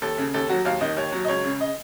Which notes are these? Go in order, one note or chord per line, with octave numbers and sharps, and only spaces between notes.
D#2 A4
C#3
D#2 A4
F#3 F#4
D#2 F5
D#3 D#5
D#2 C#5
F#3
D#5
C#2 C#5
C#3
D#5